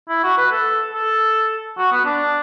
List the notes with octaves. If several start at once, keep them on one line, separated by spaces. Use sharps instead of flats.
E4
F#4
B4
A4
A4
F#4
B3
D4